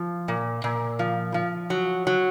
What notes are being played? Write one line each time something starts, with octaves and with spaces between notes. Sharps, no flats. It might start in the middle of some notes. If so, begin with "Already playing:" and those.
Already playing: F3
A#2
A#2
F3
F3
F#3
F#3